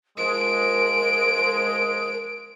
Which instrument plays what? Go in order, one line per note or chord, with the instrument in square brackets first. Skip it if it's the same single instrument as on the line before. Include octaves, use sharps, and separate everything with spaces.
[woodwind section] F3 G#3 [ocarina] A#4 [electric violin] D7